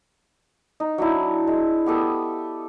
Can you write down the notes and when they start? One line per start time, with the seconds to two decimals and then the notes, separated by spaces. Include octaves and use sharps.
0.80 D#4
0.98 F#3 D4 E4
1.48 G#3
1.86 B3 G4 A4 D#6